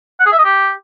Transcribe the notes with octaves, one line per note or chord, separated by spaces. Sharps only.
F#5
G#4
E5
D#5
G4